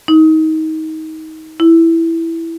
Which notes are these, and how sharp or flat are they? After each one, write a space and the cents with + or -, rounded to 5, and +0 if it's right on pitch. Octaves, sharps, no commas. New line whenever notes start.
D#4 +25
E4 +0